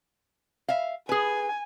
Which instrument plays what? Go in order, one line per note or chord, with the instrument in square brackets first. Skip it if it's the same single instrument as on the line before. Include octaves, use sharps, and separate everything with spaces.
[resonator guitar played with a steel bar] E5 F5
[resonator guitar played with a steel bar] G#4 B4 [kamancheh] G#5